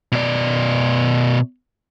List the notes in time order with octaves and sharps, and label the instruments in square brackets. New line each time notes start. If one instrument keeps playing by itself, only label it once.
[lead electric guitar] B2 D5